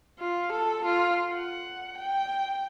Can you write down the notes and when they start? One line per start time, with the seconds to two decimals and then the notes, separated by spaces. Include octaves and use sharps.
0.19 F4
0.52 A4
0.85 F4
1.32 F#5
1.98 G5